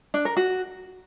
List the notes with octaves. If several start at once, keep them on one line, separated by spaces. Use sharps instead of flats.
D4
A#4
F#4